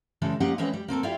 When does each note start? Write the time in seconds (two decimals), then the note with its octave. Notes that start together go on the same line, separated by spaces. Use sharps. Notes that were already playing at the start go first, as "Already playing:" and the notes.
0.22 C#3 E3 G3 G#3 A4
0.40 A#3 C#4 D#4 F4 G4 F#5
0.58 E3 G#3 C4 C#4 B4
0.73 G3
0.88 A#3 C4 A4 A#4
1.03 E4 F4 G4 D5 E5 F5